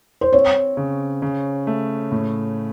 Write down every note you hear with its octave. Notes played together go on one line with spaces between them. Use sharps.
C5
C4 C#5
C#3
C#3
A3
A2